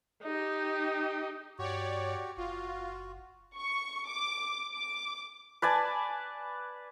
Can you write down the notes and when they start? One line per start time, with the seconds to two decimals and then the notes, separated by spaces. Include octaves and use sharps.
0.23 D#4 G4
1.59 G2 F#4 G4 C#5 D5
2.37 F#1 F4 F#4
3.56 C#6
4.08 D6
4.74 D6
5.62 B4 D5 G#5 A5